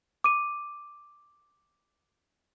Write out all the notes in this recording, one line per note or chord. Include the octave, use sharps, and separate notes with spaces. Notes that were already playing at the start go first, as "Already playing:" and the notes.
D6 D#7